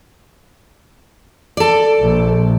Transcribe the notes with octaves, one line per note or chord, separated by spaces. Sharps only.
A4 D5
A#1